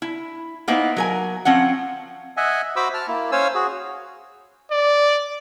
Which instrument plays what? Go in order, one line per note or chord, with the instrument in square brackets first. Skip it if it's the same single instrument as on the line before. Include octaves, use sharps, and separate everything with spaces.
[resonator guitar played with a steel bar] E4
A#3 B3 D#4 E4 C5
F#3 A#4 G#5
F3 C4 C#4 F#5
[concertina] D#5 E5 F#5 G#5
F#4 C5 E5 B5 D6 E6
A5 F6
A#3 E4
C#4 C5 C#5 F5 G#5 E6
F#4 G#4
[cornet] D5